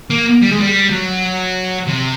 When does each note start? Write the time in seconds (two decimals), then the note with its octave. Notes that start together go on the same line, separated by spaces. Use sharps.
0.10 A#3
0.42 G3
0.51 G#3
0.60 G3
0.90 F#3
1.87 C3